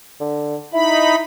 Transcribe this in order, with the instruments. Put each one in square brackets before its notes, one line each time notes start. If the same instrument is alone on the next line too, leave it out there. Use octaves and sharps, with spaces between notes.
[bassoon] D3
[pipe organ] D#4 B5 [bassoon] E4